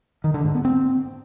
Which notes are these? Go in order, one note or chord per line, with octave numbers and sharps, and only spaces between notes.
D#3
D3
G#2
B3
C4